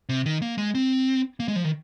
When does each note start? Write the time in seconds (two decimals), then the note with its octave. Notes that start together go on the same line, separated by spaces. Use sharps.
0.09 C3
0.26 D#3
0.42 A#3
0.58 G#3
0.75 C4
1.40 A#3
1.48 G#3
1.56 F3
1.64 D#3